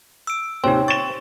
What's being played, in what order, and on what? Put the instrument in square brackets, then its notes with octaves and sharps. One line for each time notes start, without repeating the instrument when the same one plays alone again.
[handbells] E6 D7
[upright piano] D#2 C3 [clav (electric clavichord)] C4 [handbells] D#4 C#5
[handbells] C#6 [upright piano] A6 E7